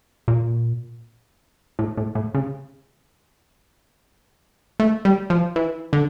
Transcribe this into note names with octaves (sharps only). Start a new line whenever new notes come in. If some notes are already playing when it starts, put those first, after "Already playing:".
A#2
A2
A2
A2
C#3
A3
G3
F3
E3
D3